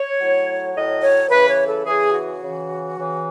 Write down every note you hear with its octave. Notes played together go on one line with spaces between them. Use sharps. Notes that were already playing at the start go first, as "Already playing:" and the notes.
Already playing: C#5
A2 F#3
A2 F#3 D#5
C#5
C#3 E3 B4
C#5
A4
C#3 E3 G#4
F#4
C#3 E3
C#3 E3